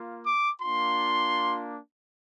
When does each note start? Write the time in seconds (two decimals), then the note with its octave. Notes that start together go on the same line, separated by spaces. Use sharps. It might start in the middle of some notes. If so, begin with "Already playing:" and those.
Already playing: A#3 F4
0.26 D6
0.61 A#3 D4 F4 C6